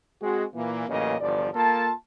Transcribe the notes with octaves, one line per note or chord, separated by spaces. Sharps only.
G#3 C4 F#4
A#2 E3 A#3
A1 A#2 C#3 F#3 A#3 D#5
G1 E2 F3 D5
A#3 F4 A4 A5